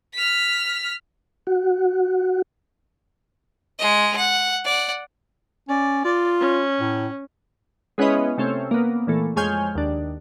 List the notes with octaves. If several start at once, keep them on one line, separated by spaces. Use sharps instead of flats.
F6 B6
F#4
G#3 D#5
F#5
D5 F#5
C#4 D5
F4 D5
C#4
A2
G#3 B3 C#4 E4 B4 D#5
C3 A3 C4 C#4
A#3 B3
A#2 E3 A3
F2 G#3 C#5 G#5 F6 G6
D#2 D4